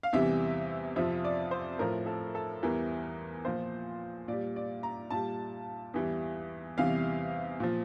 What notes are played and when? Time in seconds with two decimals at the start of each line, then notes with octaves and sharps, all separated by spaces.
0.03 F5
0.13 E2 C3 E3 G3 E5
0.96 F2 C3 F3 E5
1.25 D5
1.51 C5
1.79 A2 F3 A#4
2.06 A4
2.35 A4
2.62 E2 E3 G3 A#4
3.45 A#2 F3 C5
4.28 A#2 D5
4.33 G3
4.56 D5
4.83 A#5
5.11 A#2 G3 A5
5.94 E2 E3 G3
6.77 E2 C3 E3 G3 F5
7.60 A#2 F3